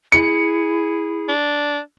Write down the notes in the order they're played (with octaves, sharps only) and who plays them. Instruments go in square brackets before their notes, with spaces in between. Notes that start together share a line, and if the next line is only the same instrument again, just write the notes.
[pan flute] E4 [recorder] G#4 [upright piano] C#7
[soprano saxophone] D4